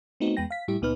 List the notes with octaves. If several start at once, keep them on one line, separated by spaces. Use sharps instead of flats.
A3 B3 C4 D#4 F#4
E2 G#3 B3 G5 A#6
F5 B6
A2 G3 E4 G4
C#2 A#2 B3 D#4 B4 F6